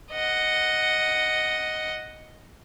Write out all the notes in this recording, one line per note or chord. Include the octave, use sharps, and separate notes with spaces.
D#5 F#5